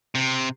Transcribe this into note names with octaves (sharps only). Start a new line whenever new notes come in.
C3